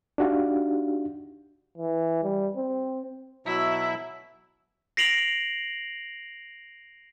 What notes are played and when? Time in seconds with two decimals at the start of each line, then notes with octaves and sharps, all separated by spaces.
0.18 D4 D#4 F#4 G4 F5
1.77 E3
2.23 G3
2.56 C4
3.46 B2 F#3 E4 E5
4.97 A#6 C7 D7 F7 F#7